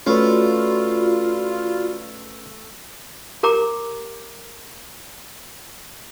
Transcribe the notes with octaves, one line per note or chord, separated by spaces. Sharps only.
A3 C#4 F4 F#4 B4 D5 B5
G4 A#4 A#5 D6